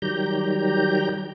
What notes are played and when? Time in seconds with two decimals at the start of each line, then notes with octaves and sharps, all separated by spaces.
0.02 D#3 F#3 G3 G4 A#5 G6